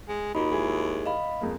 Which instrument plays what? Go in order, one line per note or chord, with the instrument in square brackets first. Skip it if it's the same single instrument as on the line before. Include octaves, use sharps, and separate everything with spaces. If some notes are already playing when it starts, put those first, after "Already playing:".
[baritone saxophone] G#3
[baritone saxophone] D#2 [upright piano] D#4 [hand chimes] F4 F#4 B5
[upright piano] G#3 E4 G#4
[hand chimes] D#5 F5 B5
[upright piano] F2 G#3 A#3